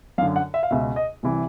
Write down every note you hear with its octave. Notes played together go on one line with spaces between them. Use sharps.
F#2 D3 F5
F#5
E5
F5
C#2 B2 E5
D#5
C2 C3 E3